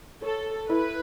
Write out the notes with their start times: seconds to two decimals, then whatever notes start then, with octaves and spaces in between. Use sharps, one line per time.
0.22 A4 C#5
0.69 E4 B4